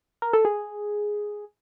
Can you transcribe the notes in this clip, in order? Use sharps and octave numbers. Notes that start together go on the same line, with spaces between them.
A#4
A4
G#4